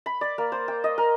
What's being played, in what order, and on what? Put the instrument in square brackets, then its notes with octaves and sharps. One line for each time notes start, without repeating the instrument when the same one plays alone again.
[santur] B5
D5
A#3
C5
G5
D#5
A#4